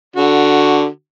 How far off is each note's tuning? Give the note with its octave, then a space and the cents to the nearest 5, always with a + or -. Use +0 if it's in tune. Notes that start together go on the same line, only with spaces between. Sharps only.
D3 +0 F#4 +0